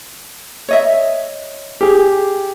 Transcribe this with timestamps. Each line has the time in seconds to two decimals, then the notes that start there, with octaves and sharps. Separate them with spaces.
0.69 C#5 D#5 E5
1.81 G4 G#4